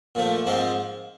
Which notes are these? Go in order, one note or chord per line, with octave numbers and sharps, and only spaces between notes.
A#2 F3 A3
G#2 F3 G#3 C4